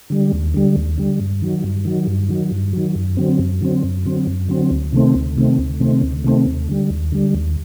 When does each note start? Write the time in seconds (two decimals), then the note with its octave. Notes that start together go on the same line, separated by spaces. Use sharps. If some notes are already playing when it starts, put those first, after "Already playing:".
0.10 D3 G3
0.32 D#2
0.54 D3 G3
0.76 D#2
0.98 D3 G3
1.20 G2
1.42 D#3 F#3
1.64 G2
1.85 D#3 F#3
2.07 G2
2.29 D#3 F#3
2.52 G2
2.73 D#3 F#3
2.95 F#2
3.17 D3 F#3 C4
3.39 F#2
3.61 D3 F#3 C4
3.84 F#2
4.05 D3 F#3 C4
4.27 F#2
4.48 D3 F#3 C4
4.71 D2
4.93 C3 D#3 A3 C4
5.15 D2
5.36 C3 D#3 A3 C4
5.58 D2
5.80 C3 D#3 A3 C4
6.02 D2
6.24 C3 D#3 A3 C4
6.46 D#2
6.68 D3 G3
6.90 D#2
7.12 D3 G3
7.34 D#2